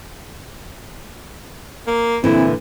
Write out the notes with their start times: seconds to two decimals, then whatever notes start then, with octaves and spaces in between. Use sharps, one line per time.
1.87 A#3
2.24 A#2 D3 E3 C4 E4